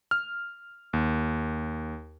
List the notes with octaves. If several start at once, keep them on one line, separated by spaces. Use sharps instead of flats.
F6
D#2